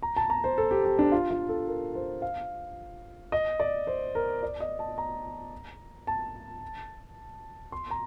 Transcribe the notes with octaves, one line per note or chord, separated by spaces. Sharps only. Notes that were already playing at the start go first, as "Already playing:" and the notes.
A#5
A5
A#5
C5
A4
G4
G4
D4
F4
F4
A4
A#4
C5
F5
D#5
D5
C5
A#4
D5
D#5
A5
A#5
A5
C6
A#5